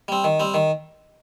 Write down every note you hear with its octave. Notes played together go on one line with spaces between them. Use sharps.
G3 C4
D#3
G3 C4
D#3